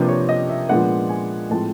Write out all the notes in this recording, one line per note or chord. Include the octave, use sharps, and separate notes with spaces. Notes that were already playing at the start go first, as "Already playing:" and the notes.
Already playing: C3 F3 A#3 D4 B4
C#5
D#5
E5
A#2 F3 G#3 B3 D4 F#5
G#5
A2 F3 G#3 C4 A5